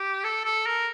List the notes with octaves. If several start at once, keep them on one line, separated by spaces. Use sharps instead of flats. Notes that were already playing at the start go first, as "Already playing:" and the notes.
Already playing: G4
A4
A4
A#4